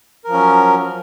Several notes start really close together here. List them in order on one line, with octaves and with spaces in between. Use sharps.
A#4 F3 C#4 F#3